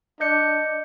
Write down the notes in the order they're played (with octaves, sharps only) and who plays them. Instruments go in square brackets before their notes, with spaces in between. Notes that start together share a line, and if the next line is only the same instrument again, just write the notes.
[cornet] D4 [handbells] D#5 G6 C#7